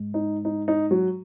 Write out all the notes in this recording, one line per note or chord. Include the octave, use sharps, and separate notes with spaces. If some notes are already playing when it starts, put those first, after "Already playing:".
Already playing: G#2
D#4
D#4
D#4
F#3 F#4